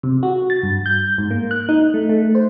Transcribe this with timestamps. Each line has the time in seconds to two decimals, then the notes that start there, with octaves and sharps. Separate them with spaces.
0.03 C3
0.23 F#4
0.50 A6
0.63 G2
0.86 G6
1.18 G#2
1.31 A#3
1.51 F#6
1.69 D#4
1.94 A3
2.09 A3
2.35 C5